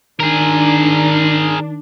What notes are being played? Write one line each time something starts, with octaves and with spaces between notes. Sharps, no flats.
D#3 D4 G#4 A#4